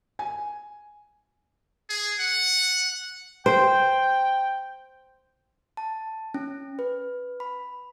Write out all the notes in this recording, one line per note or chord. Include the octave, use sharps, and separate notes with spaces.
G#5
G#4
F#5
C5 G5
A5
C#4
B4
B5